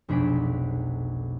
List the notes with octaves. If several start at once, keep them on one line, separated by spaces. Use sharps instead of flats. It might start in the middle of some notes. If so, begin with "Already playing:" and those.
F1 B1 D4 G#4 B6 D7